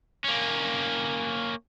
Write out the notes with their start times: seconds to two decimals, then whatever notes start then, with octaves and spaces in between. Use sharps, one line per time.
0.24 A#3 C#4